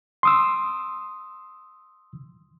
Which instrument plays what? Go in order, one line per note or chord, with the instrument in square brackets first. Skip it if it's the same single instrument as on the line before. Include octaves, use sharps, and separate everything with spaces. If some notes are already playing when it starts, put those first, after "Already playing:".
[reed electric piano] C6 D#6 E6